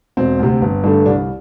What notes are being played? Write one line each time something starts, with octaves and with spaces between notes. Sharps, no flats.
E1 C4
D2 C3
G1
G2 D3 A3
C2 D4